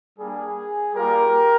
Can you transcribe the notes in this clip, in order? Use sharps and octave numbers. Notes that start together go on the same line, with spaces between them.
G3 A#3 D4 G#4
G3 A#3 F4 G4 A#4